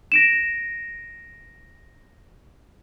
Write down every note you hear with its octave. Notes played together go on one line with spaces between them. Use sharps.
A#6 D7 E7